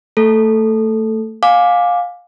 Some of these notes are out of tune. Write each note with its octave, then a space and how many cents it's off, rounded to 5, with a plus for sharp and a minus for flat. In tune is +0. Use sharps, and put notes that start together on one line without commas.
A3 +20 A4 -5
F5 +20 G#5 +0 D6 +0